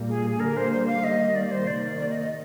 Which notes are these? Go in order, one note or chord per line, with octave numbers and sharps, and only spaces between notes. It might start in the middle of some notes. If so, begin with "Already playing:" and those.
Already playing: A#2 G3 A#3
G#4
G#4
D3 G3 A#3 A#4
C5
C5
F5
D#3 G3 A#3 D#5
D5
C5
C3 D#3 A#3 D5
D5
D#5
D#5